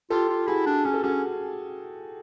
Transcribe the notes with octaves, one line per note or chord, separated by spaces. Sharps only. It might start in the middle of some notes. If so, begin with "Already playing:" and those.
F4 G4 A4
F4
E4 F#4 G#4
D4
C#4 G#4
A4
C#4 F#4 G#4